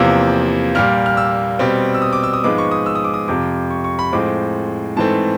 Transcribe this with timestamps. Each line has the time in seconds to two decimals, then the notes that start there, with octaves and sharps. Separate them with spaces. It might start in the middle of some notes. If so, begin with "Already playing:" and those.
Already playing: E2 C3 F3 A#3 E6
0.75 A#2 G3 A#3 F6
1.06 F6
1.17 E6
1.59 B2 G3 C4
1.94 E6
2.02 D#6
2.13 D6
2.23 E6
2.34 D#6
2.44 G#2 F3 G#3 B3 D6
2.58 C#6
2.71 D#6
2.86 E6
2.95 D#6
3.04 D6
3.14 D#6
3.28 F2 C3 F3 D6
3.71 C#6
3.84 C#6
3.99 B5
4.12 A2 F3 G#3 C4 D6
4.96 G#2 E3 A3 C4 A5